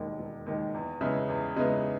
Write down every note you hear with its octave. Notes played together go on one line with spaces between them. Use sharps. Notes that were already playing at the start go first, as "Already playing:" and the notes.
Already playing: E1 D#2 D#3 G#3
E1
D#2 D#3 G#3
E2
C#3 G#3 B3 E4
E2
C#3 G#3 B3 E4